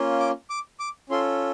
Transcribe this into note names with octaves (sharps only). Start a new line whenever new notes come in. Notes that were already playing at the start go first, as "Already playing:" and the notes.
Already playing: A#3 C#4 F4
D6
D6
D6
C#4 F4 A4 C6